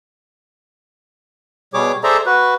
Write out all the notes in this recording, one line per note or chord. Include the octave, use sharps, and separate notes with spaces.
B2 G3 G#4 C#5 D6
G#4 A4 C5 D5 E5 A#5
F#4 B4